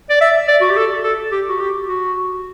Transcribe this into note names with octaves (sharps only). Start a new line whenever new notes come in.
D5
E5
D5
F#4
G4
A4
A4
G4
F#4
G4
F#4